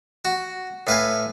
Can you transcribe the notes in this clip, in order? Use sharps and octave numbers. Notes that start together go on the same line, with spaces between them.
F#4
A2 B4 F5 G#5